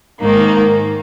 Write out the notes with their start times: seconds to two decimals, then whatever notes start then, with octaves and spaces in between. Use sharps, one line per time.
0.21 G#2 D#3 A#3